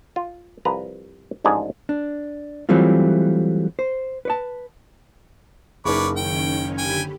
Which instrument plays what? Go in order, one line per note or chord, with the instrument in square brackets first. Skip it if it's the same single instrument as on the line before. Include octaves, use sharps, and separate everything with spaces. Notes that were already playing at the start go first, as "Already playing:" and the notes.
[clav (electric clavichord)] F4
C2 F3 B4 A#5
A1 G#2 F3 D4 G#4
[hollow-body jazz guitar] D4
E3 F#3 G3 A3 C4 F4
C5
B4 C#5 A5
[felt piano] F#1 A#4 [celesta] D#4 G#4 [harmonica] B4 C#5 D5 [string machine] E5
[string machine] D#3 C#4 C#5 [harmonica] G5
[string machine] D3 G4 B5 [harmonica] G5 G#5